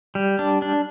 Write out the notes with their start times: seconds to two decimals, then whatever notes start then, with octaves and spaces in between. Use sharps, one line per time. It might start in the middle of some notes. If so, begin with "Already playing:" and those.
0.15 G3
0.39 D4
0.62 D4